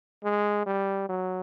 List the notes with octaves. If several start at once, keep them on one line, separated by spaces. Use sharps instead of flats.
G#3
G3
F#3